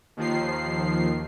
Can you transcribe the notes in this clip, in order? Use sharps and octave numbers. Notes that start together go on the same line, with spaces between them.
D#2 D#3 F3 C7